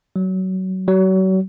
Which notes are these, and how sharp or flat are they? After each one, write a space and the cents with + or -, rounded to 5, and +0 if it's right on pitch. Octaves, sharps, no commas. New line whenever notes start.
F#3 +20
F#3 +35